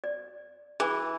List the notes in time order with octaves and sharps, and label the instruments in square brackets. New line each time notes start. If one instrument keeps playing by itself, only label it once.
[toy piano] D5
[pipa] E3 [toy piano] G#4 G#5